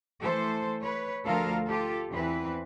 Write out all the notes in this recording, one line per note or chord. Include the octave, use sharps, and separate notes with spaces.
E3 A3 A4 C5
B4 C#5
D2 F3 F4 A4 A#4 F5
F4 G4 A4
E2 E3 C4 B4